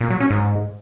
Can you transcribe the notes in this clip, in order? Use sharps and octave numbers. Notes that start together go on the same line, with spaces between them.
A#2
F#3
C#4
G#2